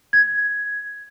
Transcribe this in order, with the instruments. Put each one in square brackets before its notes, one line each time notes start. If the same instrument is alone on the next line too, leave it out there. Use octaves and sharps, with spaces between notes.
[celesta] G#6